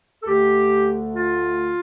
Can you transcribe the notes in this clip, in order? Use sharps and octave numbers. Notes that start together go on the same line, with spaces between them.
A4
D2 D3 A3 G4
F4